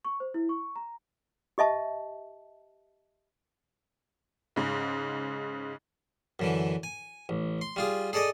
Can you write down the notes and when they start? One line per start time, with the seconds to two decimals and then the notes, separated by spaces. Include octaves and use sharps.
0.05 C#6
0.20 C5
0.34 E4
0.49 C#6
0.76 A#5
1.58 G4 D#5 E5 A5
4.56 G#2 C#3
6.39 F#2 D3 E3
6.83 G#5
7.29 A1
7.61 C6
7.76 G3 F4 G#4
8.13 G#4 A4 D5 D#5 G#5